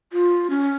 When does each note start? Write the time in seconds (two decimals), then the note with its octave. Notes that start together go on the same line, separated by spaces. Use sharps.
0.13 F4
0.50 C#4